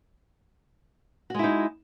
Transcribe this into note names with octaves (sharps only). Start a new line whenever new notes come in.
G#3 D#4 E4 F#4